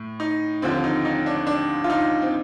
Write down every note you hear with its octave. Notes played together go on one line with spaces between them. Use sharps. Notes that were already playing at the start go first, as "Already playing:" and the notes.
Already playing: A2
D#4
D#2 D3 F3 C4
D#4
D#4
D4
D4
F4
D#4
C4